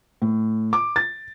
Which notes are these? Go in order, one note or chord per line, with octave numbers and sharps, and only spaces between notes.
A2
D6
A6